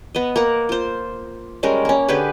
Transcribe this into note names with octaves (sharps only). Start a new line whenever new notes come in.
B3 D#5
A#3 A#4 F#5
F4 C5
G3 G#3 C#4 A#4
A#3 C#4
D3 G4 G#4 B4